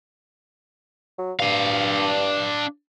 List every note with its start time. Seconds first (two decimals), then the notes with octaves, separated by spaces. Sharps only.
1.19 F#3
1.40 G2 D4 F5